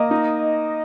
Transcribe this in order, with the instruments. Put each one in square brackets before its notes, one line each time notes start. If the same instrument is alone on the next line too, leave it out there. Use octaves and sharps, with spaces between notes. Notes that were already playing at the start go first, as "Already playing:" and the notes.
Already playing: [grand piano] A#3 [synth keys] D#5
[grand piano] D#4